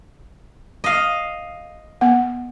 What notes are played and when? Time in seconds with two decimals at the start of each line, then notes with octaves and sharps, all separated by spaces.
0.84 D#5 F5
2.01 B3 F#5